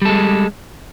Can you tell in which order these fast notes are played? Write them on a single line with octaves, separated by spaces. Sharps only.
G3 A4 G#3